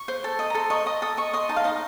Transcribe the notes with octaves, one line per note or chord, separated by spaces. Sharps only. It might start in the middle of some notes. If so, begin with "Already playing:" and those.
Already playing: C#6
C5
A4
D#5
A#5
A4 C6
D#5 C#6
D#5 D#6
A4 D#6
D#5 C#6
D#5 C6
D#4 A5
F5
D#4 D#5